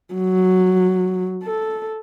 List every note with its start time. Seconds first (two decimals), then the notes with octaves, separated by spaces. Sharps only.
0.14 F#3
1.43 A4